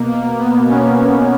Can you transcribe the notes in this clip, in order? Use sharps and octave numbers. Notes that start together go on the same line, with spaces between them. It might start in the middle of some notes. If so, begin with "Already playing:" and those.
Already playing: B2 A#3
A#3
B3
C#4